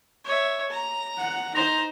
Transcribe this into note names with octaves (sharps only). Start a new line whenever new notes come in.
C#5 E5
A#5
F#5
D#4 C5 A#5